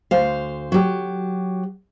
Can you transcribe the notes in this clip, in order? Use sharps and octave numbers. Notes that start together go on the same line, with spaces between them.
D2 C5 F5
F#3 G4